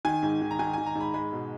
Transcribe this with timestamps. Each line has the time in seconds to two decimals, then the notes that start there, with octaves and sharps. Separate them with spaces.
0.05 D#3 G#5
0.23 G#2
0.42 D#3
0.51 A#5
0.59 D#3 G#5
0.73 G#5
0.78 D#3
0.86 A#5
0.95 G#2
1.00 B5
1.14 G#3 B5
1.32 B2